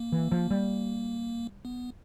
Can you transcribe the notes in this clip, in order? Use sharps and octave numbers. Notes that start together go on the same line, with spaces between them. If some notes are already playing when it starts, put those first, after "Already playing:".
Already playing: A#3
E3
F3
G3
B3